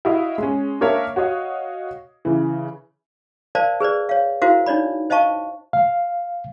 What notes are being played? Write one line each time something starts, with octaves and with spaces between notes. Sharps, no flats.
E4 F#4 D#5 F5
G#3 C#4
A#3 D4 A#4 C#5 E5 F5
F#4 C#5 D#5 F5
C#3 E3
A#4 C5 D5 F5 A5
G#4 B4 C5 D5
C#5 F5
E4 F#4 A#4 C5 F5
D4 D#4 C#5 D5 B5
C5 D#5 F5 A5 C#6
F5